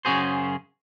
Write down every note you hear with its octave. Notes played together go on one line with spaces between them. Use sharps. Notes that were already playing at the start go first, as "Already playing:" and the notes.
F#2 C#3 C#4 F#4 G#4 C5